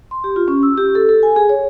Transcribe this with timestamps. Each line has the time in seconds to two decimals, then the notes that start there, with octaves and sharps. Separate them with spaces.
0.11 C6
0.24 G4
0.36 F4
0.48 C#4
0.63 E6
0.78 G4
0.95 A4
1.09 A4
1.23 G#5
1.36 G#4
1.49 C#5